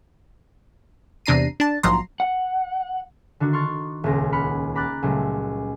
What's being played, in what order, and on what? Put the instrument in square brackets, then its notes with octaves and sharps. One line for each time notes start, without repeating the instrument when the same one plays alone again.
[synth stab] E2 C3 D4 A#5 C7 D#7
D4 A5
A#1 G#2 F3 F#3 A#5 C6
[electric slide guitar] F#5
[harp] D3 D#3 D4 F#4
C6 C#6 F6 A6
D#1 C#2 A#6
F#5 B5 F6 C#7
A#5 B5 D6 F6 F#6 A6
C#2 A#2 F#3 G3 A3